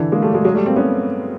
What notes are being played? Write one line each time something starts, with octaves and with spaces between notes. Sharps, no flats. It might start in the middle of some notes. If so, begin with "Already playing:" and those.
Already playing: D3 E3
G#3 A#3
G3 A3
F#3 G#3
F#3 G#3
G3 A3
A#3 C4
B3 C#4